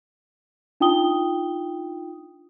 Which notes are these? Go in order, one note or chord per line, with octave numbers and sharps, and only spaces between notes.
D4 D#4 F4 G5 D#6 G7